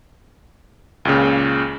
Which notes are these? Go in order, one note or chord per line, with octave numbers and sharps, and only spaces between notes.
C#2 A#2 C#3